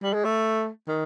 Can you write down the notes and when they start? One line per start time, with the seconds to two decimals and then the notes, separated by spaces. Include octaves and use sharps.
0.03 G3
0.13 G#3
0.25 A3
0.87 D#3